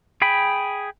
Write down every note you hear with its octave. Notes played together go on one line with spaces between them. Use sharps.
G#4 G5 B5